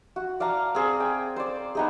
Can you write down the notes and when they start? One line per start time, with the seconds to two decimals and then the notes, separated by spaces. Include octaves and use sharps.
0.16 F#4
0.40 D5 F5 A5 A#5
0.75 C4 G#4
1.00 G5
1.36 C5 D5
1.75 B3 D#4 G#4